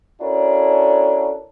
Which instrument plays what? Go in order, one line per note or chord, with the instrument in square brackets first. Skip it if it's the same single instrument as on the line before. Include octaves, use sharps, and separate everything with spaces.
[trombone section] C#4 D4 E4 F#4 A4 A#4